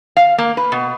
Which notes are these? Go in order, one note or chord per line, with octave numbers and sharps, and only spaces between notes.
F5
A#3
B4
B2